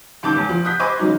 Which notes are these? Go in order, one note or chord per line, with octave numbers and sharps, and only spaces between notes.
C#2 D#3 A5 D6 G6
E2
F3
D#6 F#6 G6 B6
C5 D#5 G#5 B5 C#6 D6
C#3 E3 F#3 D#4